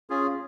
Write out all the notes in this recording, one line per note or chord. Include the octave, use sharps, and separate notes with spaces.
C#4 F4 G#4